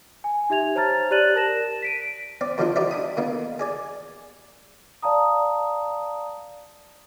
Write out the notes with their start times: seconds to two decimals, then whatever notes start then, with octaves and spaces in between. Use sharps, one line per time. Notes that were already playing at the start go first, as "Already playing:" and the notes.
0.24 G#5
0.50 D#4 G4 E5 G#6 F7
0.75 C5 C#5 A5 A#5 F6 A6
1.11 G4 D5 F#6 A6 D#7 F#7
1.35 A#4 A5 A#6 E7
1.82 B6 D7 D#7
2.41 C4 D5
2.58 F#2 D3 F3 D4 D#4 C5
2.76 F#3 D#4 G4 C5 D5 E5
2.91 D4 B5 D#6
3.17 D3 A#3 B3 D#4
3.59 G#4 D5 G#5
5.02 D5 F5 A5 A#5 D#6